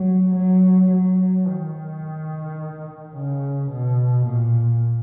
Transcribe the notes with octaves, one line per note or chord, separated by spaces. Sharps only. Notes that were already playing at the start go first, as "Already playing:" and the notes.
Already playing: F#3
F#3
F#3
D#3
C#3
B2
A#2